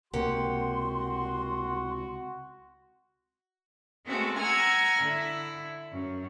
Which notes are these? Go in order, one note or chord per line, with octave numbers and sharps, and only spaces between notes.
C#2 C3 A#3 F#4 G4 F#5 C6
G#3 A3 B3 C4 F#4 A4
F#5 G#5 A#5 E6 F6 G#6
D3 E4
F#2